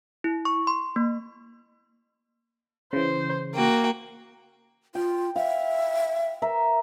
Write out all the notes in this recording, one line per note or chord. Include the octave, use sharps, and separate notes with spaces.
E4
C#6
C6
A#3
C#3 E3 C5
A#3 F#4 G5
F4 G5
E5 F5
A#4 E5